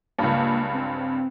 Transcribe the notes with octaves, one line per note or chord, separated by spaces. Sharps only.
C#2 G2 A#3
C4